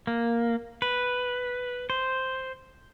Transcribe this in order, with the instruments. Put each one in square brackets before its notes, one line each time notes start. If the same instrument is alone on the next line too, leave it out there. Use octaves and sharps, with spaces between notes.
[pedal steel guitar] A#3
B4
C5